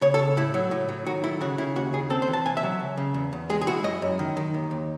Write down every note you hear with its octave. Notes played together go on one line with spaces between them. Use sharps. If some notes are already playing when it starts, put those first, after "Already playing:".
C#3 C#5
A4
C#3
A2 E4
F#3
A2
F#3
D#3 F#4
A3 E4
C#3 F#4
C#3 E4
D#2 F#4
C#3 G#4
C4 A4
C5
E3
A5
C3 G#5
E5
F#3
C#2
C#3
E2
E2
G#3 G#4
G#4
E4 F#4
F#2 D#5
F#2
D#3
D#3
D#2
D#2